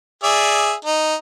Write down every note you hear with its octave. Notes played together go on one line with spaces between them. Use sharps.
G#4 D5 E5
D#4